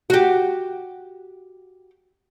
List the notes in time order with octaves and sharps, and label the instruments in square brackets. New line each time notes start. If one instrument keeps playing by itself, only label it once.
[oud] F#4 G4